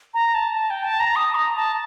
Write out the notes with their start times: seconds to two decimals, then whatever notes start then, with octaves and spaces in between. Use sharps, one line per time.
0.14 A#5
0.35 A5
0.55 A5
0.70 G5
0.84 A5
1.00 A#5
1.16 D#6
1.35 A#5
1.56 A5